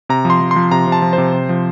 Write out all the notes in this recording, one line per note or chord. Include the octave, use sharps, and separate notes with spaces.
C3 A#5
F3
C6
F3
C6
F3
C3 A#5
C3 A5
F3
C3 C5
C3
F3